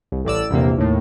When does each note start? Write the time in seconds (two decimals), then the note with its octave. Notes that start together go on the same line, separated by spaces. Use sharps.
0.12 C2
0.25 A1 A2 D5 E6
0.50 A#1 E2 C3 A#3
0.78 D#2 A2